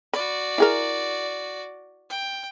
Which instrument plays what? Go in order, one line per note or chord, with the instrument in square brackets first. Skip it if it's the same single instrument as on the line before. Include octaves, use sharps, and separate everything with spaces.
[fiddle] F#4 D5 [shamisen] B5
[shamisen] E4 G#4 A#4
[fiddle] G5